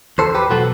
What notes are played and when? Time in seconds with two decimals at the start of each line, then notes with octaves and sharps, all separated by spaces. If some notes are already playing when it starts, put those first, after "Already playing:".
0.18 E2 A4 C5
0.35 G4 B4
0.50 B2 F#3 B3 F#4 A4